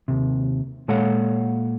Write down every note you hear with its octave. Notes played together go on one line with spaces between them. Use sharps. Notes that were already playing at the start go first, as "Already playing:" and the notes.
D#2 C3
A#2 G#3 A4 C#5 F5 F#5